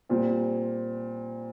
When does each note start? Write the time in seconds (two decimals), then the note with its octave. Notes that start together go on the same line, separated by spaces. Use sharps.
0.09 A#2 G3 C4